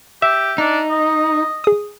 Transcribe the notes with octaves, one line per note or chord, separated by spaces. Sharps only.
G4 E5
D4 D#4
D#5
G#4 D#6